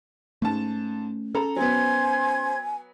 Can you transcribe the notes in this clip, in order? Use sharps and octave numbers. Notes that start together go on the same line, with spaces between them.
G#2 A3 C#4 A5
C#4 A4 A#5
F#3 B3 C5 G#5 C6 G#6